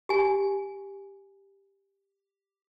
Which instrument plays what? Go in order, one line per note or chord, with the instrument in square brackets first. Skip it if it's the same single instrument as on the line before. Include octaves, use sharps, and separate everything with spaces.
[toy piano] G4 G#5